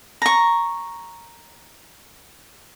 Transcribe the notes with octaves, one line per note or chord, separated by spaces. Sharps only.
A#5 C#6